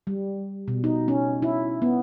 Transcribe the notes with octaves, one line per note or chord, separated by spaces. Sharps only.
G3
B2
D#4
C#4
E4
B3